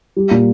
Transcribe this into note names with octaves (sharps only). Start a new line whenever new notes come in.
G3
A#2